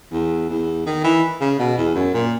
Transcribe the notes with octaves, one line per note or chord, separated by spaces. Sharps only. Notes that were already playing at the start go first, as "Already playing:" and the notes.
E2
E2
D#3
E3
C#3
B2
E2
F#2
A#2